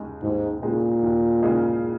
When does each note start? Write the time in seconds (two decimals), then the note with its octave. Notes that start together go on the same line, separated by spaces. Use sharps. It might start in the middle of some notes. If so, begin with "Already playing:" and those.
Already playing: D#2 C#3 G#3 D#4
0.22 D#2 G#2
0.62 A#2 C#3 G#3 D#4
1.02 D#2
1.42 C#3 G#3 D#4